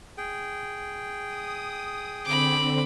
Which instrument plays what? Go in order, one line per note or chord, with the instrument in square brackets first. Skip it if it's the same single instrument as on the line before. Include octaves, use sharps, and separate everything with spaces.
[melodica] G#4 G5
[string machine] D#6
[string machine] D3 C4 [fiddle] B5 D6